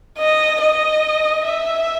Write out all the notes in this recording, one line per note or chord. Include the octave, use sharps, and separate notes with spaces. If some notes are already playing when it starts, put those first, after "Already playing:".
D#5
D#5
E5